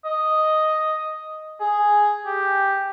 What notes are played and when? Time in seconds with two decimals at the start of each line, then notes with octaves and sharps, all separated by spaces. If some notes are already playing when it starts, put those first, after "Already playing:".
0.05 D#5
1.61 G#4
2.26 G4